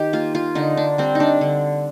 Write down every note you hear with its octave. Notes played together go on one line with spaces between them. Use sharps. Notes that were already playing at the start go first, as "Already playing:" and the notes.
Already playing: D#3 G4
A#3 F4
F4
D3 D#4
D4
G3 C4
D#4
D4
D3